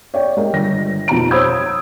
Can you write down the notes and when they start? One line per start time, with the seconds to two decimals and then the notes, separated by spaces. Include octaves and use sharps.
0.14 C#5 D5 G5
0.37 G#3 A#4
0.53 G1 A#6
1.08 F2 B2 D#4 A#5 D7
1.31 C5 C#5 B5 D#6 E6 G#6